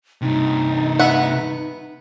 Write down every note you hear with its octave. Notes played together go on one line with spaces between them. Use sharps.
G2 C3 D#4
B3 E5 F#5